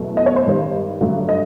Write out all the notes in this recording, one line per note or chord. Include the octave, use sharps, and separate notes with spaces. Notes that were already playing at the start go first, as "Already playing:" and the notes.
Already playing: E2 B2 F#3 A3
D#5
C#5
C5
G2 D#3 G3
G2 D3 F#3 A3
D#5